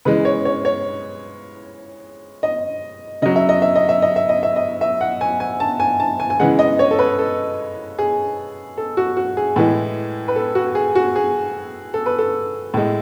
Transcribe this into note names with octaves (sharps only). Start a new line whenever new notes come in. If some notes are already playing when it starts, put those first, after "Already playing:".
C#3 E3 G#3 B4
C#5
C#5
C#5
D#5
C#3 F#3 D#5
E5
D#5
E5
D#5
E5
D#5
E5
D#5
E5
D#5
E5
F#5
G#5
G#5
A5
G#5
A5
G#5
G#5
C#3 E3 G#3 F#5
D#5
C#5
A4
B4
A4
G#4
A4
F#4
F#4
G#4
A2 E3 G#3
B4
A4
F#4
G#4
F#4
G#4
A4
B4
A4
A2 G#3